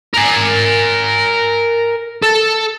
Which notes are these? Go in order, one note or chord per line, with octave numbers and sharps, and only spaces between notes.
A#4 G#5
A4